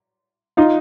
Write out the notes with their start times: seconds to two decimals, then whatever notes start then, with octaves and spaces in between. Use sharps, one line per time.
0.57 D#4 F4